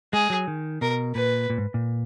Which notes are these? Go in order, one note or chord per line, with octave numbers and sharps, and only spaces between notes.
G#3 G#4
F#3
D#3
B2 A#4
A#2 B4
A#2
G#2
A#2